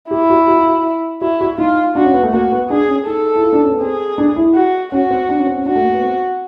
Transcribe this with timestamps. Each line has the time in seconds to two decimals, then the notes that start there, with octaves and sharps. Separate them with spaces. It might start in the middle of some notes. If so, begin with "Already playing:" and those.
0.11 E4 G4
0.30 F#4
0.48 F#4
0.58 F4
0.67 F#4
1.21 E4 F#4
1.41 F#4
1.58 D#4 F4
1.95 D4 F#4
2.04 C#4
2.14 B3
2.23 A3
2.33 A#3 F#4
2.52 B3
2.70 D4 G#4
2.88 C#4
3.06 D#4 A4
3.36 E4
3.44 F4
3.53 D4
3.62 C#4
3.71 B3
3.81 C4 G#4
4.18 D4
4.36 E4
4.55 F#4
4.92 C#4 F#4
5.11 C4
5.29 D4
5.38 C#4
5.47 C4
5.56 C#4
5.66 D4 F#4
5.75 A3
5.84 A#3
5.94 B3
6.02 C4